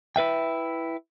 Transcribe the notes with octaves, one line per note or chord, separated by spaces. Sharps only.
E4 B4 E5 G5